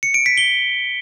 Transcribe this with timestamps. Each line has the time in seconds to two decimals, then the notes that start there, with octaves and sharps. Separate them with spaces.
0.03 C#7
0.14 D7
0.26 B6
0.37 G7